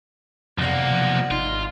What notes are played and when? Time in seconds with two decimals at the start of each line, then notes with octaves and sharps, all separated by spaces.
0.58 B1 F2 C3 A#3 D5 F#5
0.91 F3
1.31 G#1 D#4 F4